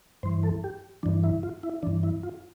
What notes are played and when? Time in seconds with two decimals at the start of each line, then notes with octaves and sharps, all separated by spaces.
0.23 G2 E3 C5
0.43 A4
0.64 G4
1.03 G2 E3 D4
1.24 E4
1.43 F4
1.63 E4
1.83 G2 E3 D4
2.03 E4
2.23 F4